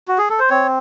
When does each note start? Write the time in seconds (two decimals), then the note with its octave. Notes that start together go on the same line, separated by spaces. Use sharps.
0.08 F#4
0.18 G#4
0.29 A4
0.39 C5
0.50 C4 C#5